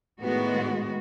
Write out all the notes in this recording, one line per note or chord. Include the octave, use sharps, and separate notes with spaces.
A2 D#3 G#3 B3 F#4